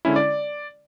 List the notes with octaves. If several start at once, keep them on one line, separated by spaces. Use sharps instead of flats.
D3 G#3 C#4 E4
D5